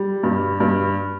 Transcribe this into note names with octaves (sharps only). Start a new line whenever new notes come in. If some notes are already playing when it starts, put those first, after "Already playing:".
Already playing: G3
G2
G2